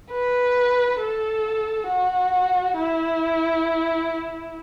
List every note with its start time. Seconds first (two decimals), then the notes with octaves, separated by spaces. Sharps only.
0.11 B4
0.99 A4
1.88 F#4
2.77 E4